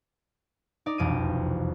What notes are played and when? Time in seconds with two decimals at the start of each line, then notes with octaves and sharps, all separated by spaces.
0.86 D#4 D5
0.98 E1 C2 F2 D7 D#7